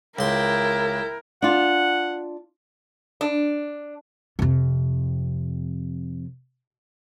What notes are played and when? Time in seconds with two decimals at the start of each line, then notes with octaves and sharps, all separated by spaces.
0.19 C#2 E4 A#4 G5 C6
1.42 D4 F4 F#5
3.21 D4
4.39 F2 C3